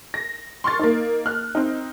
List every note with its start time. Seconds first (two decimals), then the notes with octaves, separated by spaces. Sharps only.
0.14 A#6
0.64 C6 C#6 F6 A6
0.79 A#3 D#4
1.26 F6 F#6
1.55 C4 D#4